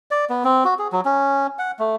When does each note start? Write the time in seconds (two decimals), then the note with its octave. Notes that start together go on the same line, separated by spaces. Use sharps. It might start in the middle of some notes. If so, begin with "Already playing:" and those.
0.11 D5
0.30 B3
0.45 C4
0.65 F#4
0.79 G#4
0.92 F#3
1.05 C#4
1.59 F#5
1.79 A3